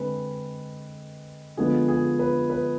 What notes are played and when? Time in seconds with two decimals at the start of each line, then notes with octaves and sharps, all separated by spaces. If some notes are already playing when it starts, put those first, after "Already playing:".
Already playing: D3 G#3 C4 B4
1.57 D3 F3 G#3 B3 G#4
1.88 G#4
2.19 B4
2.50 B4